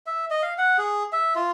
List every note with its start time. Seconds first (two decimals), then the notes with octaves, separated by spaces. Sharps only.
0.06 E5
0.31 D#5
0.43 F5
0.58 F#5
0.78 G#4
1.12 E5
1.36 F4